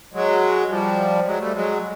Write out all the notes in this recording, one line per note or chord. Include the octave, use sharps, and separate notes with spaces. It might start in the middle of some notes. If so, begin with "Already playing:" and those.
F#3 G#3
F3 G3
F#3 G#3
G3 A3
F#3 G#3